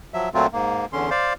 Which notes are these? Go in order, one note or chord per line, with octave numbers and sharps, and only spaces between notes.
F3 F#3 E5
A#2 F#3 A3 C4 F4
G#2 A#3
E2 D3 C#4 C6
C5 D5 F5